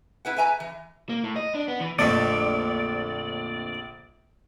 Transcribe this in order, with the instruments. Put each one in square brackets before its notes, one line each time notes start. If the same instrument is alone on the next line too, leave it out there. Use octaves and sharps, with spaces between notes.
[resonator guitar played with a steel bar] E4 B4 F#5
B4 E5 G#5 A#5
E3
[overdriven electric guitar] A#3
A2
D#5
D4
B3
E3
[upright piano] A#1 [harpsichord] F2 D3 A3 [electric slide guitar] D5